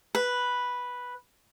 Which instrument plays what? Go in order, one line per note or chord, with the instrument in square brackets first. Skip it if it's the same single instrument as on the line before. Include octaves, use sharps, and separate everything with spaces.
[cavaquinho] B4